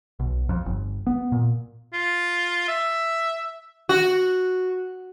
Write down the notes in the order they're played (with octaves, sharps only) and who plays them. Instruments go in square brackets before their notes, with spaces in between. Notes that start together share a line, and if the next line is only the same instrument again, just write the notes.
[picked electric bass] B1
F2
G1
B3
A#2
[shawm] F4
E5
[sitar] F#4